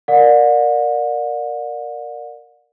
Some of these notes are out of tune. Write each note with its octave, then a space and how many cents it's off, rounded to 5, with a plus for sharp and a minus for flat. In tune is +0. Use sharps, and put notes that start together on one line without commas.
A#4 +0 D5 +10 F#5 -45